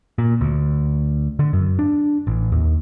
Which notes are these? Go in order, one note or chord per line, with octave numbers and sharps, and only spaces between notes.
A#2
D2
D3
F#2
D4
A1
D#2